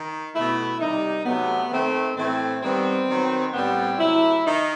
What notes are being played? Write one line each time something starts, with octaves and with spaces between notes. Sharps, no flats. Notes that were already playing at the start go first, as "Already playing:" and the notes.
Already playing: D#3
B2 A3 E4
C3 D#3 G3 D#4
C3 F#3 A3 B3
D#3 A3 C4
A2 E3 A3 C4
D#3 G3 B3 C4
D#3 F#3 B3
A2 G3 B3 C4
C3 F#3 A3 E4
D#3 D#4